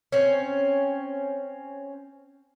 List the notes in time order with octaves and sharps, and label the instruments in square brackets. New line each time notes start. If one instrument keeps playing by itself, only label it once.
[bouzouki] C4 C#4